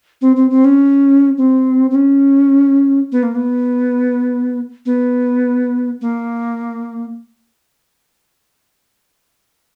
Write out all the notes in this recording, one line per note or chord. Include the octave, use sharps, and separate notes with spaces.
C4
C4
C4
C#4
C4
C4
C#4
B3
A#3
B3
B3
A#3